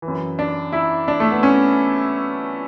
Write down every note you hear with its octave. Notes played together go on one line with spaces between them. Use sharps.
E3
F#2
D4
E4
D4
A3
B3
C#4